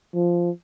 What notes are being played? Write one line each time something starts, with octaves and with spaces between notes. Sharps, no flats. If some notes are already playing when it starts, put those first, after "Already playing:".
F3